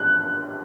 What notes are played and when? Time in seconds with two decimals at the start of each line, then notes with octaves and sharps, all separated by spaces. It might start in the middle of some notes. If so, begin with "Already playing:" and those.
Already playing: F#6